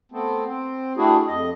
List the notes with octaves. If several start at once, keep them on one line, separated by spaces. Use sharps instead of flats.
A3 B3 C4
C4
G3 A3 D4 E4 F#4 G#4
F2 D#5